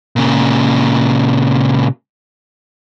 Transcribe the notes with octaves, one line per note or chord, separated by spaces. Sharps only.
A#2 C#3